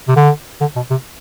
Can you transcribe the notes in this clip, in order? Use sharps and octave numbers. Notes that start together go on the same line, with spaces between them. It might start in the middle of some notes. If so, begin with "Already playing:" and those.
C3
D3
D3
B2
C3